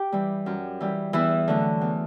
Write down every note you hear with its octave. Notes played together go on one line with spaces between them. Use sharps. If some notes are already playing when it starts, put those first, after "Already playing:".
Already playing: G4
E3 G3
F#2
E3 G3
E2 E3 E4
D3 F#3 A3
E2